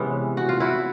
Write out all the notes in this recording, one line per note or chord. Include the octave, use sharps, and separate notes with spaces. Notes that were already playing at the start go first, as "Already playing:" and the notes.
Already playing: C3 E3 G#3 B3 C#4
F#4
F4
E4 F#4